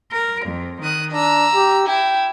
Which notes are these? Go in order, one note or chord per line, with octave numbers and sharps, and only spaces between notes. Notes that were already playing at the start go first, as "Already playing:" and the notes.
A#4
F2
D#3 D#6 F#6
D4 A#5 E6
G4
E4 G5